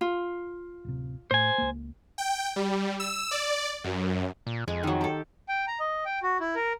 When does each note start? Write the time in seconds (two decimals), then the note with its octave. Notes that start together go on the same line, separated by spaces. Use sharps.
0.01 F4
0.85 D1 C3
1.31 A2 C5 G#5
1.58 C#2 A#3
2.18 G5
2.56 G3
3.00 E6
3.31 D5
3.84 F#2
4.47 A#2
4.68 F2 G#3
4.83 D#3 F#3
5.01 G4 A4
5.49 G5
5.68 A#5
5.80 D#5
6.05 G5
6.23 F#4
6.40 E4
6.55 A#4